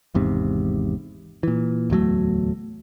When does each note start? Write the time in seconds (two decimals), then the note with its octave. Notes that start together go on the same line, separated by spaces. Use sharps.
0.14 G#1 E2 G#2 C3
1.43 A#2 E3
1.90 D1 E2 F#3 A3